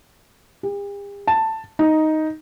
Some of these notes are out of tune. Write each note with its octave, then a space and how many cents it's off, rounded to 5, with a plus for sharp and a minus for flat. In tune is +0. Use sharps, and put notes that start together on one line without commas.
G4 +45
A5 +10
D#4 +5